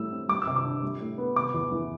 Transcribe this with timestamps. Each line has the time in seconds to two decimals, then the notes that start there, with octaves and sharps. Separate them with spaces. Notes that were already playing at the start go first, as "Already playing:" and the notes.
Already playing: A2 G3 E6
0.11 C4
0.29 G3 D6
0.42 E6
0.47 C3
0.56 D6
0.64 D4
0.83 G3
1.00 A2
1.18 B3
1.36 C3 D6
1.54 E2
1.72 E3